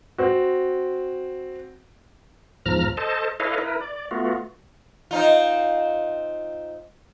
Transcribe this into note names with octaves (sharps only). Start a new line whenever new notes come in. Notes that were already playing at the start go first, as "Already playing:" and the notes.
C4 F#4
E2 G#2 F3 A#5 F6
A4 C5 D#5 A5
E4 A4 B4 C#5 D#5 F5
E4 A#4 B4
D5
A3 B3 F4 F#4
C4 D#4 F4